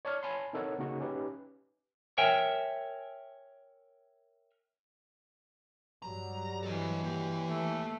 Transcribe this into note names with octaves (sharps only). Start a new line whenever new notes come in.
C#5 D5 A5 C#6 F6
C#5 G#5 A5 B5 C6
C4 D#4 A4 A#4 C#5 F#5
C#3 A#3 C#4 D#4 F#4 G#4
C#4 D#4 G4 B4
A#4 C#5 E5 G5 G#5
G2 F#3 G3 A#5
E3 A4 D#5
A#3 G4
A3